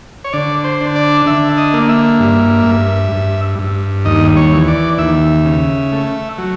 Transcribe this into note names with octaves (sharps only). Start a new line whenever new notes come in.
C#5
D3 D5
C5
D4
D5
D3 E5
D#5
A#3
E5
G2
G2
G2
G2
D#2 D#5
C#5
E3
D5
D#2 E5
C#3
A3
F#3